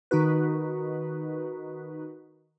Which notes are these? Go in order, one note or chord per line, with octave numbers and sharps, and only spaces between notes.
D#3 D#4 F#4 B4